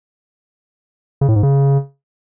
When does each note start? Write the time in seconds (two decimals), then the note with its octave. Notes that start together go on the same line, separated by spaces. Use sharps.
1.21 C#3
1.29 A2
1.36 G#2
1.43 C#3